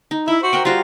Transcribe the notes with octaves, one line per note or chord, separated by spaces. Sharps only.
D#4
E4 E5
F#4 C5
A#4 F#5 G5
G3 F4 F#4 C5